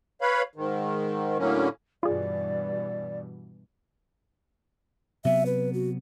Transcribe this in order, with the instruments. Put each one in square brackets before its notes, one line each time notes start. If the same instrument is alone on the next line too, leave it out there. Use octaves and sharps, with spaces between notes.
[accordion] B4 C#5 F5 B5
G#2 D#3
A2 D3 F#3 A#3 C#4
[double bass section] G2 B2 E3 [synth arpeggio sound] F4 G#4 [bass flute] D5
[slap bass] C3 F#3 B3 [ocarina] E5
[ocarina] B4
F#4